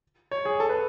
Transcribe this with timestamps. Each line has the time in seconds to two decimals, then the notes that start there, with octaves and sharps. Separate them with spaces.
0.31 C#5
0.45 G#4
0.60 A4
0.69 B4